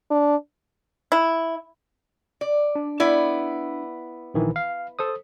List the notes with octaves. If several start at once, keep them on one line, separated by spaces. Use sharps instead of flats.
D4
E4
D5
D4
B3 E4 D5
A#1 D#3 E3
F5
A4 C5 D#6